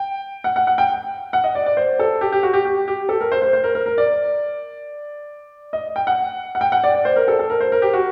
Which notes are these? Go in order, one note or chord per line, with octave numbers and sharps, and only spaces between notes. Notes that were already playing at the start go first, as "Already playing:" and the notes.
Already playing: G5
F#5
F#5
F#5
G5
F#5
D#5
D5
D5
C5
A4
G4
G4
F#4
G4
G4
G4
A4
A#4
C5
C5
C5
A#4
A#4
A#4
D5
D#5
G5
F#5
F#5
G5
F#5
D5
D5
C5
A#4
A4
A4
A#4
C5
A#4
G4
F#4